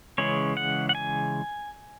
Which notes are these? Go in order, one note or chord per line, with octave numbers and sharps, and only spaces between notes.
C#3 E3 G#3 C#4 C#5
F#5
F#5
G#5